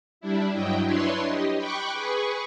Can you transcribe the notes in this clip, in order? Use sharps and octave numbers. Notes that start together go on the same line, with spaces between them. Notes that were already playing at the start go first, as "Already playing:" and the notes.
G3 D4 E4
G2 F#3 E4 D#5 G5
D4 E4 B4 C#5 C6
G4 D#5
G5 B5 C#6 D6 F#6
G#4 B4 C#6